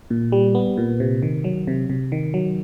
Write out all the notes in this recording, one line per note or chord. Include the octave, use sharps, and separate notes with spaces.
A#2
G3
B3
A#2
C3
D#3
F#3
C3
C3
D#3
F#3